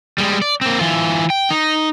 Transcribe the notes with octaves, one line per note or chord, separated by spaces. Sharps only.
G3 G#3
D5
A#3 C4
E3 F4
G5
D#4